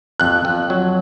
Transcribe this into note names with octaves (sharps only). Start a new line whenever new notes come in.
F2 F#6
F2
F#3